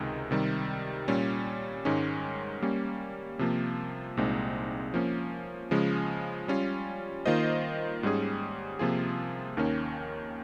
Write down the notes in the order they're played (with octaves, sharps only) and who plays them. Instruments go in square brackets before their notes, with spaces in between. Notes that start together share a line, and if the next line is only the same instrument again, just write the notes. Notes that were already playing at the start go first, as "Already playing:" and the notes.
Already playing: [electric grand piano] C#2 C3 D#3 G#3 D#4
C3 D#3 G3
A#2 G3 C#4
G#2 D#3 G#3 C#4
G3 A#3 C#4
C3 F3 A#3
C2 A#2 G#3 C4 D#4
F3 A#3 C#4
C#3 F3 G#3 C#4
G3 C#4 F4
D#3 A#3 F4 C5 D#5
G#2 G3 C#4 G#4
C3 F3 A#3 F4 G#4
D#2 D#3 A#3 C#4